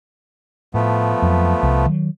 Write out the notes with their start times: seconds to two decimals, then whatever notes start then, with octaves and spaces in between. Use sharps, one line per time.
0.74 A2 F3 A3 B3
1.22 F2 F#3
1.63 C2
1.86 D#3 F#3